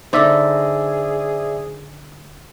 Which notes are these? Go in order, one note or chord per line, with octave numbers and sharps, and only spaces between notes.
D3 D#4 G#4 C5 D5 E5